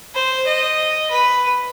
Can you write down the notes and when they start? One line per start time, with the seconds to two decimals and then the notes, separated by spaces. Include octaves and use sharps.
0.15 C5
0.47 D#5
1.11 B4